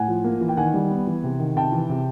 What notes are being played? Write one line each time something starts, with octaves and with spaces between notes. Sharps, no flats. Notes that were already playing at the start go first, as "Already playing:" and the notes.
Already playing: A2 F#5 G#5
F3
A#3
E3
G5
D#3 F#5 G#5
G3
B3
E3
C3
D#3
C3 G5 A5
E3
C3